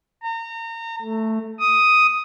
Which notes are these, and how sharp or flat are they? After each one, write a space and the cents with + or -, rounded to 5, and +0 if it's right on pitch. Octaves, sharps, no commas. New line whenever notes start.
A#5 -30
A3 +5
D#6 +5